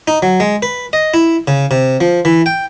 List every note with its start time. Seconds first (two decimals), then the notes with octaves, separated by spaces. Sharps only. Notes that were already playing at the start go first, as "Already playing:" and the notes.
0.08 D#4
0.22 F#3
0.40 G#3
0.62 B4
0.93 D#5
1.14 E4
1.48 C#3
1.71 C3
2.01 F3
2.25 E3
2.46 G5